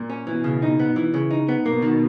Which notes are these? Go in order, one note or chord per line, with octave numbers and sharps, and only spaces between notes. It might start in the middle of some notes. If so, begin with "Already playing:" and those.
Already playing: A#2
C#4
B2 E3
C#3
D#4
B3
E3
C#3
D#4
B3
B2 A#3
D#3